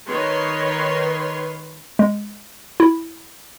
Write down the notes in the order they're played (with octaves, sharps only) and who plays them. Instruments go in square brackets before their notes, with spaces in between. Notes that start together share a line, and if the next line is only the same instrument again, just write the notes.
[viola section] D#3 B4 C#5 C6
[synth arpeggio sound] G#3
E4